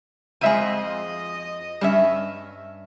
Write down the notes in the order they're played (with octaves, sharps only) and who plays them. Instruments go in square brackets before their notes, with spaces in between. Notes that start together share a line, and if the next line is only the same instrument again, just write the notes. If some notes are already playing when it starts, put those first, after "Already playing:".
[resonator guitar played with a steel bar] F2 F3 G#4 [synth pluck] G#3 E5 D#7 [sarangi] D#5
[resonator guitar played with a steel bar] G2 C#4 E5 [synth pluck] G3 E7